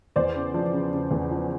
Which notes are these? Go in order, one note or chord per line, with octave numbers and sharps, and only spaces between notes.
E2 C5 D5
C#3
F3
C#3
C#3
E2
F3